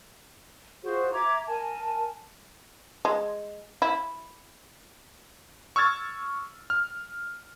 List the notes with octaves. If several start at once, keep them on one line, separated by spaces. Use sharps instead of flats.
F4 F#4 G#4 C5
E5 A#5 D6 G#6
A#4 G#5 A5
G#3
E4
C#6 E6 F6 G#6 A6
F6